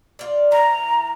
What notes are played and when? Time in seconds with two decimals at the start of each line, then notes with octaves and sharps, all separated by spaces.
0.19 F4 D5
0.52 E3 A#5